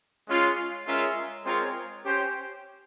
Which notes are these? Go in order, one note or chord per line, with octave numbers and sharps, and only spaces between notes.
G#3 C#4 F4
G#3 C#4 F4 A#4 E5
G#3 C4 F4 A#4 C#5
C#4 G4 C5 G5